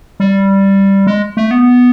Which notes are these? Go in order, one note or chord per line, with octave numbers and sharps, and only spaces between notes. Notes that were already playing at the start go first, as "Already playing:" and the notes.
G3
G#3
A3
B3